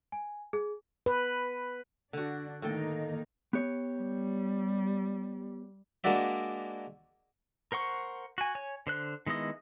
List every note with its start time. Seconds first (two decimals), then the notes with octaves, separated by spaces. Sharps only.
0.12 G#5
0.53 G#4
1.06 B4
2.13 D3 D4 F#4
2.62 A2 D#3 A#3 D#4 A4 G5
3.53 B3 G4 C#5
3.97 G3
6.04 G#3 A#3 D4 F#4 D5 E5
7.72 A#4 C5 F#5 C#6
8.38 F#4 G#5
8.55 C#5 G#5
8.87 D3 C5 F#6
9.26 D#3 G#3 B3 E4 D#5